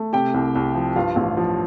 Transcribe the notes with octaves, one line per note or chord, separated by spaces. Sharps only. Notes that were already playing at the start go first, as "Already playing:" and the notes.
Already playing: A3
C3 G4 G5
C2
C2
F3
G2 F4 F5
A1
F3